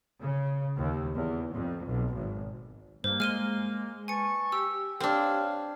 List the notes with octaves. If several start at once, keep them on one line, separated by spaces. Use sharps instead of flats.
C#3
D#2
E2
F2
B1
G#1
G2 A#3 C5
G#3 F6 D#7 G7
B4 G#5 A5 C#6 C#7
G4 E6
C4 D4 C#5 F5